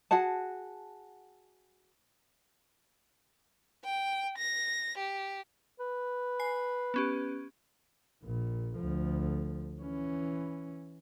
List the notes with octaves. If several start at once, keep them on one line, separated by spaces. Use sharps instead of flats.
F#4 G#4 F#5 A5
G5
A#6
G4
B4
G#5 C7
B3 C#4 G4
A#1 A#2
D2 F3
E3 C#4